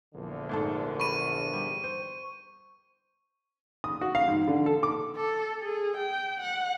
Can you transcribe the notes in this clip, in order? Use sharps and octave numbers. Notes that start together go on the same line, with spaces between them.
A#1 E2 D3
G#2 A3 A4
B5 C#6 D#7
G3
C5
D#6
F#4
F5
G#2
D3
A4
D6
A4
G#4
G5
F#5